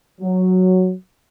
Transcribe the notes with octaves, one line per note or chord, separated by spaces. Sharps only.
F#3